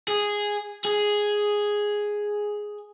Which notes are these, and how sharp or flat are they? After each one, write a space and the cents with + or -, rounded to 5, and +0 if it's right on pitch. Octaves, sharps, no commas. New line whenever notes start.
G#4 -5
G#4 +0